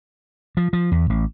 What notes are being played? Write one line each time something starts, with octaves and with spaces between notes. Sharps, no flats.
F3
F3
E2
A1